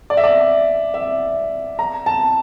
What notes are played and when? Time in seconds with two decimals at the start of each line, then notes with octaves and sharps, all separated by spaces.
0.10 D5
0.17 E5
0.24 D5
0.94 E5
1.79 A#5
2.06 A5